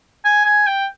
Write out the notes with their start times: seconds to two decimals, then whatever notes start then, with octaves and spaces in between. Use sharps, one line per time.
0.25 G#5
0.45 G#5
0.67 G5